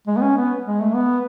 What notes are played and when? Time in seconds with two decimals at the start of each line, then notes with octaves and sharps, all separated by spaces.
0.07 G#3
0.17 B3
0.21 C#4
0.37 B3
0.66 G#3
0.81 A3
0.95 B3